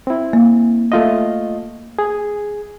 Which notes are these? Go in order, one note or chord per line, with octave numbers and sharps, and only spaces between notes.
C4 E4
A#3
A3 F4 D#5
G#4